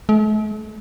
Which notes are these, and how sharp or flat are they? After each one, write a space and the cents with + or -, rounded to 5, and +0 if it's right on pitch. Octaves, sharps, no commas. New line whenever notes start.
A3 -45